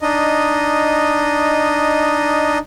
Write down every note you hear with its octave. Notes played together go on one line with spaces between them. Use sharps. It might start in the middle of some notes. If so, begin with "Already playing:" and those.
D4 D#4 D#5